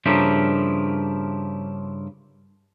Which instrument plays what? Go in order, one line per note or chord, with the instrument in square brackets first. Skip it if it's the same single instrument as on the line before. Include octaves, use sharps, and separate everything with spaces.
[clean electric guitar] G2 C#3 F3 A#3 E4 G4